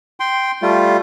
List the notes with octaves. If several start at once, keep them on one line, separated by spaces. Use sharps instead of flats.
G5 C6
G3 A3 F4